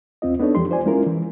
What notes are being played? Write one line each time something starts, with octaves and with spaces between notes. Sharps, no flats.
D#2 C4 F4 D#5
B3 D4 D#4 A4 C#5
F2 E3 F3 G#3 G4 C6
F4 C5 D5 G#5
G#3 C#4 E4 F4 A#4
E3